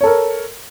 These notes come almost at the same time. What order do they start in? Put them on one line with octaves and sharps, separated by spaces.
C#5 A4 A#4